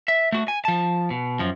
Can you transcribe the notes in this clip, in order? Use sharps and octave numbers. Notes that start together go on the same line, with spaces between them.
E5
A3 F#4
G#5
F3 A5
B2
F#2 F3